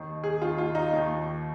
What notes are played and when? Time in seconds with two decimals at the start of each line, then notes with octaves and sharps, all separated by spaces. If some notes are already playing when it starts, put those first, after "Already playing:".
Already playing: D#2 D#3
0.24 G#4
0.41 D#3 F4
0.45 D#2
0.58 F4
0.75 D#4
0.93 D#2 D#3